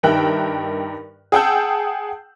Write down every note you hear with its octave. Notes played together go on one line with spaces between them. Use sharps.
G2 D#3 A#4 E5 G5 F#6
G#4 F#5 G5 A5 E6 G6